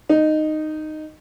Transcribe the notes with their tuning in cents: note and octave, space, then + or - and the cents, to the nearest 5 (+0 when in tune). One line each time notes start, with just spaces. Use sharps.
D#4 -10